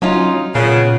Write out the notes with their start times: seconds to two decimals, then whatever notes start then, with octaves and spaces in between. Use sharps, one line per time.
0.02 F#3 C#4 D#4 F4
0.55 A#2 C#3 B3